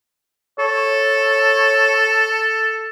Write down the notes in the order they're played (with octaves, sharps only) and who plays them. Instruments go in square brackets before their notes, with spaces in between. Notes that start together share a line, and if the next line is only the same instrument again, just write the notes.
[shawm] A4 [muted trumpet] C#5